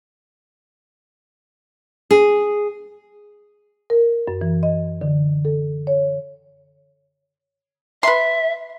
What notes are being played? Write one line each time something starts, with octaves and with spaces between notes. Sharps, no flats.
G#4
A#4
F#2
E3
D#5
D3
A4
C#5
B4 E5 C6